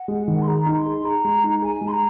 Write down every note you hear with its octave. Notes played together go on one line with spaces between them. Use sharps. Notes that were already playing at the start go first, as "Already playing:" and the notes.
Already playing: F#5
G#3
D#3
C6
G#4 A#5
D#4
C6
G#4
G#4 A#5
G#3
D#4
G#4 G#5
G#3
C6
A#5